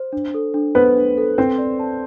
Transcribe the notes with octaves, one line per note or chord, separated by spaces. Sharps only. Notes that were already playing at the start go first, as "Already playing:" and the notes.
Already playing: C5
D4
A4
D4
B3 B4 C5
D4
A4
C4 B4 C5
D5
A5